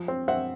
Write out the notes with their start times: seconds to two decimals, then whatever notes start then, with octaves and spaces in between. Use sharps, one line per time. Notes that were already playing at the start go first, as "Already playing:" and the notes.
Already playing: F3
0.08 C4
0.28 C4 E5 F#5